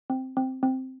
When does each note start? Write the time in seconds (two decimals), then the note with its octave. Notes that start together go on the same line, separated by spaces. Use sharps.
0.10 C4
0.37 C4
0.63 C4